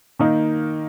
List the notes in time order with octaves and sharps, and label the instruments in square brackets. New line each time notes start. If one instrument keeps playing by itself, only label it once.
[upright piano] D#3 A#3 D#4